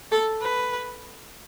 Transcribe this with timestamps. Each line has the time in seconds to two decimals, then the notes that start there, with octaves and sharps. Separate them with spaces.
0.11 A4
0.41 B4